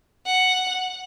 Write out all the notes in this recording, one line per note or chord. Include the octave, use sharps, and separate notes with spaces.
F#5